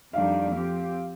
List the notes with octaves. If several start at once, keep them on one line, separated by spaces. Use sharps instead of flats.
F2 D#3 G3 D4 F5
F3 C4 G4